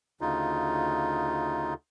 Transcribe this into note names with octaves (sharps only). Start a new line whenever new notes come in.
D2 C#3 D#4 F4